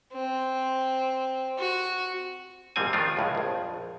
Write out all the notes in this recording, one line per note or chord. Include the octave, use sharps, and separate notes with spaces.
C4
F#4
A#1 F2 G#2 G3 C4 G#5
D#3 F3 A3 D4 F4
C#2 A2 G#3
A#1 F2